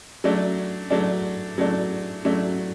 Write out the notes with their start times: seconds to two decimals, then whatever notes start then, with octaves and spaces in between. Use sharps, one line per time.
0.24 F#3 A3 D4
0.90 F#3 A3 D4
1.58 F#3 A3 D4
2.25 F#3 A3 D4